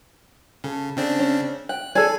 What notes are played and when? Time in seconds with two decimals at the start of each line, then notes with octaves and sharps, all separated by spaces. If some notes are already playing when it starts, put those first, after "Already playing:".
0.64 C#3 A4
0.97 C#3 C4 D4
1.20 C#4
1.69 G5 F#6
1.95 G#4 A4 D5 G#5